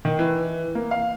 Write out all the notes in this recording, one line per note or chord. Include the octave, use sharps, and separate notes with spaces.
D#3
E3
A#3
F5